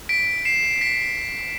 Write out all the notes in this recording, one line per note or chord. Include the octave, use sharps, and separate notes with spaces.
B6 D7
C7 E7
B6 D7